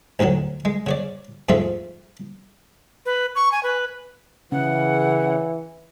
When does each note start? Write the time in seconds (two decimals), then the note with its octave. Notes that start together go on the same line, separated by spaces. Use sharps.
0.19 A1 D2 D3 D#3 F#3
0.65 G#3
0.87 C#3 C#5 D5
1.49 F2 G#2 F3 A3 F4 E5
3.06 B4
3.35 C#6
3.52 G#5
3.63 B4
4.52 C#3 E3 F#5